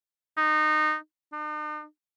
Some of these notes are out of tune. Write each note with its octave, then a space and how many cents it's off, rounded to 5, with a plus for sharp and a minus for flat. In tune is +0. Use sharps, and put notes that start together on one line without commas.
D#4 -20
D#4 -45